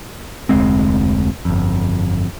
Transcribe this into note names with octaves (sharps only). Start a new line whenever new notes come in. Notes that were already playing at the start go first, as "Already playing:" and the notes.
F1 D2 G#3 C4
G1 F2